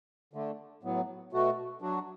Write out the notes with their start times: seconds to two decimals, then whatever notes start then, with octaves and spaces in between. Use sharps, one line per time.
0.33 D3 A3 D4
0.83 A2 F#3 B3
1.33 B2 A3 F#4
1.82 F#3 D4 F#4